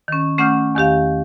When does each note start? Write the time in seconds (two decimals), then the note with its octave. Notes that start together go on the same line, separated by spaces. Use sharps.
0.08 D#3 C#4
0.38 A3 C#4 F#5 D6 F6 G6
0.75 E2 D#3 G4 F5